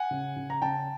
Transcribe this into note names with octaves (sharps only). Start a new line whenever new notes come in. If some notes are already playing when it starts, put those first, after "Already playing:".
Already playing: F#5 G#5
C#3
C#3
A#5
C#3 G5 A5